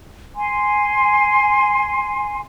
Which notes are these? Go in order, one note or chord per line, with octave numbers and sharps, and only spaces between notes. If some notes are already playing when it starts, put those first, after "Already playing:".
G#5 C6